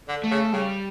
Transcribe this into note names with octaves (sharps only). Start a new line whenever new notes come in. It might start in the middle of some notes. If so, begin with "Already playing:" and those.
D3
A3
C#3
C#3 G3